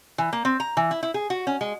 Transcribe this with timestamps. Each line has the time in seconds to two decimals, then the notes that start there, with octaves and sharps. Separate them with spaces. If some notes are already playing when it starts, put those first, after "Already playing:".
0.18 E3
0.33 A#3
0.45 C4
0.60 A#5
0.77 E3
0.91 E4
1.03 E4
1.14 G#4
1.30 F#4
1.47 C#4
1.61 G#3